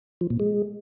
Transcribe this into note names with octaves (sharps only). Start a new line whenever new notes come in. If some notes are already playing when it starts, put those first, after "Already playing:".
F3
A#2
G#3